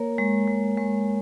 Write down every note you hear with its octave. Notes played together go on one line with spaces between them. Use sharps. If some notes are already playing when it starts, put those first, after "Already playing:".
Already playing: A#3 A#4 C#5
G#3
G#3
G#3